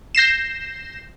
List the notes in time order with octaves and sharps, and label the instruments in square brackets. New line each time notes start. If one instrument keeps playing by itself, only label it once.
[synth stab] G6 A#6 C7 E7